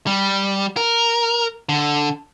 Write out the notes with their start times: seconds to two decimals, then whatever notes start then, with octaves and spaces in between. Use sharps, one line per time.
0.07 G3
0.77 A#4
1.69 D3